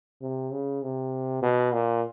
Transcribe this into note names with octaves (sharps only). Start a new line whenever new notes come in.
C3
C#3
C3
B2
A#2